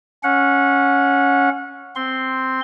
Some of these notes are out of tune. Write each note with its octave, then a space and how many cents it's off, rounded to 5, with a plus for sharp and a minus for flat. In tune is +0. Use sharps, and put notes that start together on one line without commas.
C#4 +0 F#5 -25
C4 +0 C6 +0